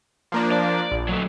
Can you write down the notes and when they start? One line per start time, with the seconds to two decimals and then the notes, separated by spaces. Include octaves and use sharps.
0.32 F3 A#3 D4
0.51 D5
0.92 A#1
1.09 F#3 A3